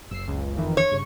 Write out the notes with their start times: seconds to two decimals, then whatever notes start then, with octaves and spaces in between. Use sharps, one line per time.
0.11 F#1 E6 C7
0.28 C#2
0.56 F2 D#3 E3
0.77 C#5
0.91 G2 C#3 C#6